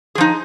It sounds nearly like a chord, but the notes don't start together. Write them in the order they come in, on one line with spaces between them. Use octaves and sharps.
G#4 F3 D#4